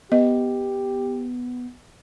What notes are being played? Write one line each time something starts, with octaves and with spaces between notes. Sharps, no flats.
B3 G4 D#5